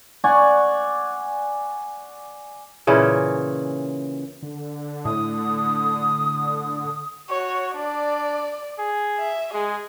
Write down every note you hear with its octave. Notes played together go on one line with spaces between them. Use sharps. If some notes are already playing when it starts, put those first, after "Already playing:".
D5 F#5 G#5 C#6
A#2 C#3 E3 C#4
D3
A2 D#6
F#4 C#5
D4 D5
G#4
E5
G#3 G#4